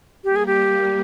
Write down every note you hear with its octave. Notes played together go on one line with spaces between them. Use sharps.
G3 A#3 G4
G#4
G4